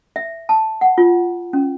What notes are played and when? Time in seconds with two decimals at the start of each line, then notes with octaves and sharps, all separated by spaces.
0.16 E5
0.49 A5
0.81 F#5
0.98 F4
1.53 C#4